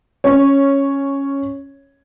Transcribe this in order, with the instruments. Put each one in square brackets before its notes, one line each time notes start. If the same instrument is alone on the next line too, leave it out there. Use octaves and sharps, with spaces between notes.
[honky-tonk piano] C#4 C#5